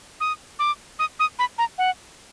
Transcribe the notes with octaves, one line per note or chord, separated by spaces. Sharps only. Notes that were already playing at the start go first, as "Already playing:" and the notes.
D#6
D6
D#6
D#6
B5
A#5
F#5